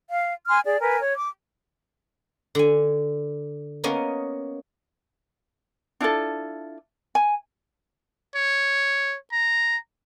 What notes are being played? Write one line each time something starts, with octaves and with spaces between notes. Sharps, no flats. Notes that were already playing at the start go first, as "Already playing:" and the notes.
F5
G#5 C6 F6
G#4 D5
A#4 B4 G#5
C#5
D6
D3 G#5
A#3 B3 C#4 D#5 F5
D4 E4 F4 A4
G#5
C#5
A#5